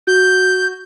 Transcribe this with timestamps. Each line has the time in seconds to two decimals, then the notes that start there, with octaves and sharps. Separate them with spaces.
0.07 F#4 G6